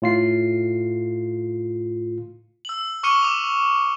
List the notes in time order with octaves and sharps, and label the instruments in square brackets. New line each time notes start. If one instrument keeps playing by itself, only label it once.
[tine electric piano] A2 F4 C7
[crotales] E6 F#7
C#6 D6 F6 C#7 D#7 G7
D6 F7